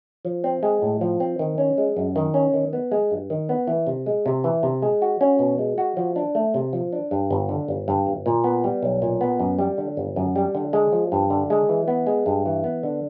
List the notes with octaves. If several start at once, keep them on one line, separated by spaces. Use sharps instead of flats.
F3
C4
G#3
A2
F3
C4
D#3
C#4
G#3
F#2
D#3
C#4
D#3
B3
G#3
G2
D#3
B3
E3
C3
G#3
C3
E3
C3
G#3
F#4
C#4
B2
G#3
F#4
F3
D4
A3
C3
F3
D4
G2
G1
D3
G1
G2
G1
A#2
B3
G3
B1
A#2
B3
F#2
G3
D3
G1
F#2
G3
D3
G#3
F3
G2
D3
G#3
E3
B3
G#3
G2
E3
B3
D3